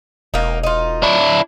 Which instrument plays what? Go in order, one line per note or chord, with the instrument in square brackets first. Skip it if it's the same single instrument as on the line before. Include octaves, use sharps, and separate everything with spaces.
[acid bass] E1 [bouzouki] A#3 D#4
[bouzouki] D#4 F4
[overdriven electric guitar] D4 E4